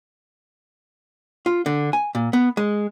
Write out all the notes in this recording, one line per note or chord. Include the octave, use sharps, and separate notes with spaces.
F4
D3
G#5
A#2
B3
G#3